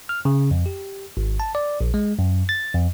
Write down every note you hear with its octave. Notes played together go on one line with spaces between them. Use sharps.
F6
C#3
F2
G4
G#1
A5
D5
A#1
G#3
F#2
A6
F2